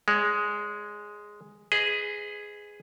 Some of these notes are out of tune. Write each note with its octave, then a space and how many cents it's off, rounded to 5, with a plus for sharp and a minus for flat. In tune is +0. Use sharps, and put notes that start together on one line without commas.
G#3 +0 C#5 +40
G#4 +0 B4 +30 D#5 +0